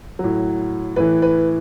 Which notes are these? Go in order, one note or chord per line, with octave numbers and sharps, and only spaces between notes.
A2 F#3
A2 E3 B4
B4